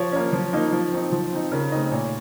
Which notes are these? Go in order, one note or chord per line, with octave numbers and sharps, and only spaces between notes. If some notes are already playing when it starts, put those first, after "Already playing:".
Already playing: F3 C#5
A#3 C#4
F3
A#3 D#4
F3
C4 D#4
F3
C4 D#4
C#3 A#4
A3 C4 D#4 D#5
A#2 C#5